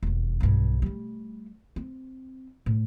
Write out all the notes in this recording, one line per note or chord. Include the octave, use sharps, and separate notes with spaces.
E1 D#2
B1 G2
G3 A3
C4
A2